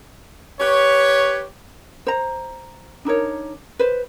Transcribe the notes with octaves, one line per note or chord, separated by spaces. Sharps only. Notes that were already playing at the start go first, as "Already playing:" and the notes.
G4 B4 C#5
C5 A#5
D4 D#4 A#4 C#5
B4 C5